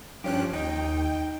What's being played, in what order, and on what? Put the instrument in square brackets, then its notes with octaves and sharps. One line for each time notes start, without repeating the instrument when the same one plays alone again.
[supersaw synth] G2 C#4 F#6 [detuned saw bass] F3 [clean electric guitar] G4
[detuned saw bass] D#2 [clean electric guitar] D#4 [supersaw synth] G5